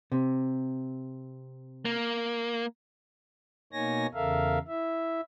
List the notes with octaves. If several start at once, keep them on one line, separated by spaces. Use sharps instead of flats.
C3
A#3
B2 A#3 D#4 C#5 G#5 A#6
E2 C#3 A4 A#4 E5 F5
E4 E5